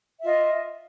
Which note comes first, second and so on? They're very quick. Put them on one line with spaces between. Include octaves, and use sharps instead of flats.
E5 F4 D#5